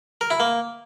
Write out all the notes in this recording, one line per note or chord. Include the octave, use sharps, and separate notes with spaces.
A#4
E4
A#3